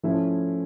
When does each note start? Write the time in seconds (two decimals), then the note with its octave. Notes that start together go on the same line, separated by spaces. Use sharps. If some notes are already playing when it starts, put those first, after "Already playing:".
0.03 F3 A3 C#4 E4